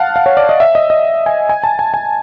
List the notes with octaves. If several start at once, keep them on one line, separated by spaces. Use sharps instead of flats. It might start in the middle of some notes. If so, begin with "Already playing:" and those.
Already playing: F5 F#5 A5
F5
C#5
D5
D#5
E5
D#5
D#5
G#5
G#5
A5
G#5
G#5